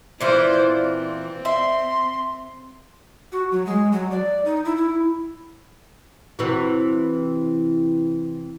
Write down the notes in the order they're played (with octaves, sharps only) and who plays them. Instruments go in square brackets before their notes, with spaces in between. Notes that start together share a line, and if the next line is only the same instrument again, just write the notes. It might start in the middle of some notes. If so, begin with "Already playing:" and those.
[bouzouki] A#2 E3 F4 [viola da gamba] E4 C5 D5
[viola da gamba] C4
[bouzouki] E5 [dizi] C6
[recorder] F#4
F#3
G#3
F#3
D5
D#4
E4
E4
[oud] C3 E3 F#4